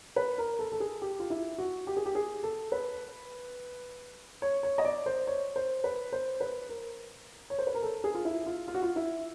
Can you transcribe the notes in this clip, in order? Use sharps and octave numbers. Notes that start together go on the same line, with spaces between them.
B4
A#4
A4
A4
G#4
G4
F4
E4
F#4
G4
G#4
G4
G#4
A4
B4
C#5
C#5
D#5
D5
C5
C#5
C5
B4
C5
B4
A#4
C#5
C5
B4
A#4
A4
G#4
F4
E4
F4
F4
F#4
F4
E4